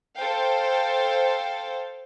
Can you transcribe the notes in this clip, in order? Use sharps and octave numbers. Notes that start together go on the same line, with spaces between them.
A4 C5 F5 G5